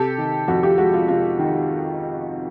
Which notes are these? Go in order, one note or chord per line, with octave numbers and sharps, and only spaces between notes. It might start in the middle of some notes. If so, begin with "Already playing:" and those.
Already playing: C3 G4 A4
D#3
F2 F#4
F4 G4
G#3 F#4
F4
C3 F4
D#3